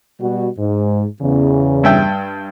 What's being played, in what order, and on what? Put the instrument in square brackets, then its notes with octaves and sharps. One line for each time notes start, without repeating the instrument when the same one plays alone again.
[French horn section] B2 G3 F#4
G#2
E2 C#3
[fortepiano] G2 E5 G5